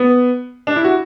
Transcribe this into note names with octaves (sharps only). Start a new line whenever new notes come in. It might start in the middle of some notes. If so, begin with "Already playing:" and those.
Already playing: B3
D4
E4
F#4